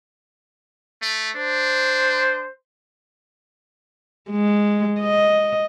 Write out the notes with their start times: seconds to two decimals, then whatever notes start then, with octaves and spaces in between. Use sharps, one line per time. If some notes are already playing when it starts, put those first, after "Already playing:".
1.02 A3
1.36 D4 C5
4.31 G#3
5.00 D#5